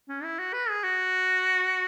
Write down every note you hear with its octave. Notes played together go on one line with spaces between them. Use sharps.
C#4
E4
F#4
B4
G#4
F#4